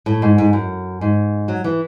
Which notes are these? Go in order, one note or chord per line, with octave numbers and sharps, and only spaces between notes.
A2
G#2
G#2
F#2
G#2
F#3
E3